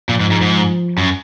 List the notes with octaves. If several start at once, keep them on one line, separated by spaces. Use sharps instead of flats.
A#2 F3
G#2
G#2
G#2
F#2